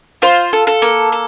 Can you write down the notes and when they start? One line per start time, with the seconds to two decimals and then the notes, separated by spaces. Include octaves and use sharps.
0.22 F4 C5
0.53 A4
0.67 A4
0.82 A#3
1.12 A4